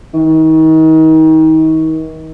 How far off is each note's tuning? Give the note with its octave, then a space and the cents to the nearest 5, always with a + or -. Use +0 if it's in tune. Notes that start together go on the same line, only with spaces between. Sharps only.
D#3 +35